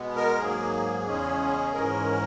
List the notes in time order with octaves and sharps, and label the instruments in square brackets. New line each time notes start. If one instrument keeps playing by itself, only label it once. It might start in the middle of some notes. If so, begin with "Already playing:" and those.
Already playing: [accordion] B2 G#3 B3
A#4
G#2 F#3 A#3 G#4
E2 C#3 G#3 C#4
G#2 E3 G#3 C#4 A#4